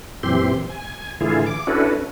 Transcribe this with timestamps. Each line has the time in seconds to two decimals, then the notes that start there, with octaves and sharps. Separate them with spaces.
0.23 F#2 A#2 E3 C4 G4 C6
0.69 G#5
1.21 A2 D3 E3 E4 F4 G#4
1.46 D6
1.67 C#4 D4 E4 F#4 A4 B4